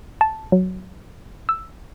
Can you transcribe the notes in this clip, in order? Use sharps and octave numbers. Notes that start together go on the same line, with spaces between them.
A5
F#3
E6